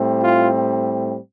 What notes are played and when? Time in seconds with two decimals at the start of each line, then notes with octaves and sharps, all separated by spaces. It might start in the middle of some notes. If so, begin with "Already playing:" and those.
Already playing: A2 G3 C4
0.20 F4